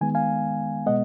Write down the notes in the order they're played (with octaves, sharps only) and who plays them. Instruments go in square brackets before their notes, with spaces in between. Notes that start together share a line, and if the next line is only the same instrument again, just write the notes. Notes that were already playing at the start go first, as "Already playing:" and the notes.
[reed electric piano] D#3 G#3 B3 G#5
F5 G#5
B2 G#3 B3 D#5 F#5